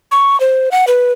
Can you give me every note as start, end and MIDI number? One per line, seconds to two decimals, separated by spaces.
0.11 0.39 85
0.40 0.69 72
0.72 0.85 78
0.87 1.12 71